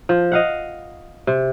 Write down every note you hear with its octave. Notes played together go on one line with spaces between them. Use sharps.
F3
D#5 F5 F#5
C3